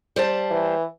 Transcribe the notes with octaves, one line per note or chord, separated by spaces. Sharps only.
G3 C5 A5
E3